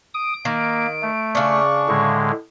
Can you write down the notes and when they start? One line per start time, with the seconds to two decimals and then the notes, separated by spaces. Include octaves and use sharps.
0.14 D#6 D7
0.45 D#3 A#3
1.02 A3
1.35 C#3 D4 C#6
1.88 A2 D3 G#3